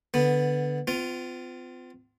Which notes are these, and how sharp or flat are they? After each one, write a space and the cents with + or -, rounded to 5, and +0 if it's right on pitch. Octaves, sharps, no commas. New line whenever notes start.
D3 +0 B3 +0
C4 -45 F4 +0